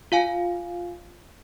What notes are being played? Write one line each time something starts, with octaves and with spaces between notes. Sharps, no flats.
F4 F5 G#5